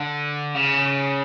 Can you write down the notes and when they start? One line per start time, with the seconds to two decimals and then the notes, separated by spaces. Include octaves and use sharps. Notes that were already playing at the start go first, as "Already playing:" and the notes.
Already playing: D3
0.55 C#3